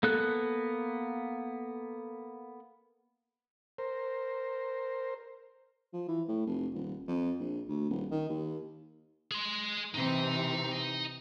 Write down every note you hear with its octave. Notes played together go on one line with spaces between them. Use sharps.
A#3 B3 A4 F#6
A#4 C5
F3
E3
A2
F1
D#1
F2
A#1
D2
D#1
D#3
D#2
G#4 C6
C3 E3 C4 D#4